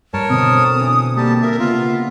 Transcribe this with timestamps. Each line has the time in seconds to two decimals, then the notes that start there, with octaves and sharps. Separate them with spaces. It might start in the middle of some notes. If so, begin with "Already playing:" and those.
0.14 G2 A#4 C#5 A5
0.30 B2 D3 C4 D#6
0.80 E3 D4
1.17 G3 A#3 G4 A5
1.42 A#4 E5
1.59 C#3 B3 F4